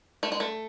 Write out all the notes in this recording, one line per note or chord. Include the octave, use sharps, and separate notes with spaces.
A3
G#3
A3